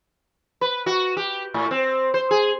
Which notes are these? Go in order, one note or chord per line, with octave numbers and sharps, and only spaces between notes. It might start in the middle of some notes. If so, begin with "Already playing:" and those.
B4
F#4
G4
A2
C4
C5
G#4